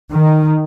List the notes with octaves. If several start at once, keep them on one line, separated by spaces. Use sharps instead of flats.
D#3